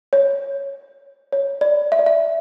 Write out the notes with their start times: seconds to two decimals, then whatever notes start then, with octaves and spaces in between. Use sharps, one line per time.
0.13 C#5
1.32 C#5
1.61 D5
1.92 E5
1.99 D5
2.06 E5